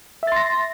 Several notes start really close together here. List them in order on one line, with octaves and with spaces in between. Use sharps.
E5 A6 C6 A#6